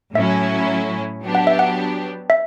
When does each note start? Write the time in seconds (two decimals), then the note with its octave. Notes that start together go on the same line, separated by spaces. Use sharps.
0.15 A2 F#3 C#4 E4 E5
1.22 F#3 B3 D4 G4
1.35 F#5
1.47 E5
1.59 F#5
2.30 E5